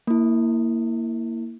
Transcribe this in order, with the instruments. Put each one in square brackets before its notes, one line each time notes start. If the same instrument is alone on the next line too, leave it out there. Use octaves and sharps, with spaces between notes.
[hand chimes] A#3 E4